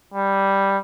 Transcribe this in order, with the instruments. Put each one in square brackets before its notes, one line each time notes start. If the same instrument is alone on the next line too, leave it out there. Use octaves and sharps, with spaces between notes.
[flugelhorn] G3